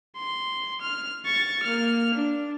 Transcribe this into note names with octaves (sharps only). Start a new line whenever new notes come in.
C6
F6
C#6 A6
A#3 F6
D4